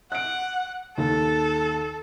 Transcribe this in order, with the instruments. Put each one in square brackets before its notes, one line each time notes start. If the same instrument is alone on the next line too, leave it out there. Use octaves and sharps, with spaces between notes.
[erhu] F#5 [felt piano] F#6 D7
[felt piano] D#2 [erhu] A4